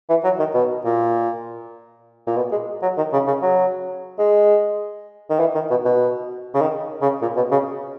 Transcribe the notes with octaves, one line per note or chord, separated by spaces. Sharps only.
E3
F#3
D#3
B2
A#2
A#2
B2
G#3
F#3
D#3
C#3
C#3
F#3
G#3
D#3
E3
D#3
B2
B2
C#3
D#3
C#3
A#2
B2
C#3